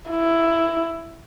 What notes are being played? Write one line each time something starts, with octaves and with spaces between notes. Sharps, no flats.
E4